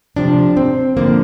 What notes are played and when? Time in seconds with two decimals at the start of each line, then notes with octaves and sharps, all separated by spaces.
0.16 D2 C3 F3 D4
0.57 C4
0.97 D3 F3 A#3